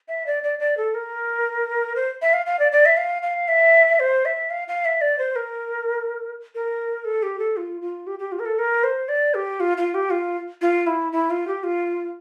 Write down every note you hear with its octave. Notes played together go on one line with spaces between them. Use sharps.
E5
D5
D5
D5
A4
A#4
C5
E5
F5
F5
D5
D5
E5
F5
F5
E5
C5
E5
F5
F5
E5
D5
C5
A#4
A#4
A4
G4
A4
F4
F4
G4
G4
F4
A#4
A4
A#4
C5
D5
G4
F4
F4
G4
F4
F4
E4
E4
F4
G4
F4